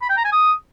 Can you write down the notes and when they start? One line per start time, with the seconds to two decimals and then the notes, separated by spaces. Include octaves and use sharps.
0.02 B5
0.09 G5
0.17 A#5
0.25 G#5
0.32 D#6